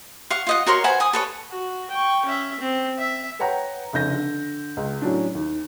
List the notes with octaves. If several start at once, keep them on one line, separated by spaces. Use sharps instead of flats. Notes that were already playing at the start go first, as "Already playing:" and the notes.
F5 F#5 C#6
F4 D#5 F#5
F#4 A#4 C#5 C6
B4 C5 F#5 G#5
G#5 D#6
A4 B4 C#5
F#4
G5 C#6
C#4 E5
C4
E5
B4 C#5 F#5 G5 A#5
F1 C#3 G6 A#6
D3
C#2
A2 F#3 C#4 D4
D#2